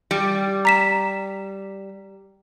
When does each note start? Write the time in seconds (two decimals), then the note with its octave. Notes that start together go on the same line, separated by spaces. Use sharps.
0.11 G3
0.65 A#5 B6 E7